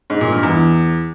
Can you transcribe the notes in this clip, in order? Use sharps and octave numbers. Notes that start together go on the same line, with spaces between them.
G#2
A#2
G2
E2